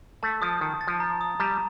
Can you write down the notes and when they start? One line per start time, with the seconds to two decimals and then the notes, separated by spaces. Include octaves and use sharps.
0.23 A3 A5
0.42 F3 D#6
0.61 D#3 A5
0.81 A6
0.87 F3
1.00 A#5
1.21 D#6
1.40 G3 A#5